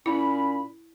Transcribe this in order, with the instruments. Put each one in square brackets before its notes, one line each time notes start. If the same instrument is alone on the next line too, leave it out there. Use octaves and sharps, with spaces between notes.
[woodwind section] A#2 C#4 B5 [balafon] E4